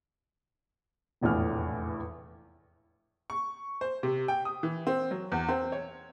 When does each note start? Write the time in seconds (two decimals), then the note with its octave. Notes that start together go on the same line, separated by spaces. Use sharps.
1.21 F1 A#1 E2 A2 F6
3.30 C#6
3.81 C5
4.03 C3
4.28 G5
4.45 D#6
4.63 E3
4.87 C4
5.11 F#3
5.32 E2
5.49 C4
5.72 C#5